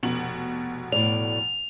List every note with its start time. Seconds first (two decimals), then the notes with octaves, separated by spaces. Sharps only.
0.03 F1 B2 F#7
0.92 A2 D5 F7